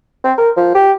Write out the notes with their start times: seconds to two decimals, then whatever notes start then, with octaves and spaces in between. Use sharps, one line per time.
0.24 C4
0.38 A#4
0.57 F3
0.75 G4